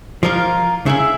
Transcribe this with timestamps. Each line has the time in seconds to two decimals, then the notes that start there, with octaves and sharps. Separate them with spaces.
0.23 F3 A#3 F4 A#4 F5
0.86 C#3 E4 G#4 E5